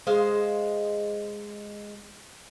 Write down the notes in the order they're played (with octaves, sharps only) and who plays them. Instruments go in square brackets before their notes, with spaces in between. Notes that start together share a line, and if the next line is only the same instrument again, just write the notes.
[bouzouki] G#3 C5 D#5 F5